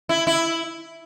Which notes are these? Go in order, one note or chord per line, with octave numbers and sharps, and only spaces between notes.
E4
E4